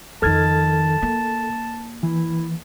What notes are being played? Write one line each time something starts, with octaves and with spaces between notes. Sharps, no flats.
F2 D#3 A4 A5 F6 G#6
A#3
E3 E4